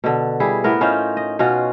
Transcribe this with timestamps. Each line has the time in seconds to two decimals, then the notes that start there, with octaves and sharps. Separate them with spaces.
0.04 B2 D3
0.40 G3 E4 G#4
0.64 A2 B3 A#4
0.81 C#4 D#4 F4 C5
1.17 D#5
1.39 B2 C#4 F4 F#4